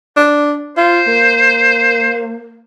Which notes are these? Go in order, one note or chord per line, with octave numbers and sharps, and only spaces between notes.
D4
F4 C5
A#3